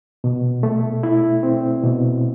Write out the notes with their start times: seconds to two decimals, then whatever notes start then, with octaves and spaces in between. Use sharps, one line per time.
0.24 B2
0.63 A3
1.03 E4
1.43 C4
1.84 B2